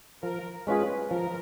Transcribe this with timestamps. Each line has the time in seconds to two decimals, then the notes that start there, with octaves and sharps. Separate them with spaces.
0.23 F3 A#4
0.67 G#3 C#4 F4 G#4 B4
1.11 F3 A#4